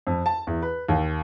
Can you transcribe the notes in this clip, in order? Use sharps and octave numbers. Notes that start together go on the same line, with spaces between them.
F2
A5
E2
B4
D#2